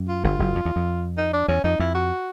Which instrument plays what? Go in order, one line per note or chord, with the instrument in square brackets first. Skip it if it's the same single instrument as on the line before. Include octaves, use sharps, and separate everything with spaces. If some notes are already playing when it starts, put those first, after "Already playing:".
Already playing: [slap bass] F#2
[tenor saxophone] F4
[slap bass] G1 G2 [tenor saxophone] F4
[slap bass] F#1 F#2
F2
E2
F2
[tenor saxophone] D#4
D4
[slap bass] E2 [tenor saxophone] C#4
[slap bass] F2 [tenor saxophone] D#4
[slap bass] F2 [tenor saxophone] E4
[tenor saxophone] F#4